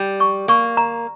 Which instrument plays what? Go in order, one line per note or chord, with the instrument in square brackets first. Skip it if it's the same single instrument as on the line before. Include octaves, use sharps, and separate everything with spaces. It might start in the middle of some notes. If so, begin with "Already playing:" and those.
Already playing: [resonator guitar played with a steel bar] G3
[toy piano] C#6
[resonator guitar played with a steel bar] A#3 [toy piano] C#6
[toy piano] A#5